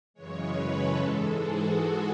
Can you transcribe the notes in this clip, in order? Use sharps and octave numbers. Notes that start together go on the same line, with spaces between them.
F#2 C#3 E3 G#3 C#5
B4
A4
G#2 E3 G#3 A4
G#4
F#4